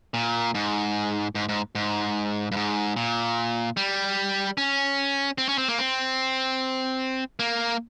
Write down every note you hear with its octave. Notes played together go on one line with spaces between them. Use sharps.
A#2
G#2
G#2
G#2
G#2
G2
G#2
A#2
G3
C#4
C4
C#4
C4
A#3
C4
A#3